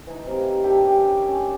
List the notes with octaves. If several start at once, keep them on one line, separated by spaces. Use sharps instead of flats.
E3 D#4
C3 A#4 F5
D4 G4 E5 G5
C#4 G4 D5 G#5
C#4